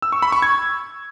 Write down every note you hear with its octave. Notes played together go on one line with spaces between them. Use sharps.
E6
C#6
B5
C#6
G#6